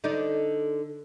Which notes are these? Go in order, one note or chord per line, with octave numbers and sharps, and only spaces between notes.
D3 D#4 D5